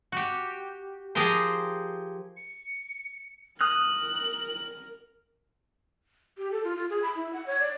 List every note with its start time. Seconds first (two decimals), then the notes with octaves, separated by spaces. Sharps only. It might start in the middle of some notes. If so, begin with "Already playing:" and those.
0.12 F#4 G4
1.15 F3 G4 G#4 A#4 C5
2.37 C#7
3.61 A#4 D#6 F6 F#6 F#7
6.38 G4
6.51 A4
6.64 F4
6.76 F4
6.90 G#4
7.03 B5
7.15 E4
7.33 F#5
7.47 C#5
7.60 D5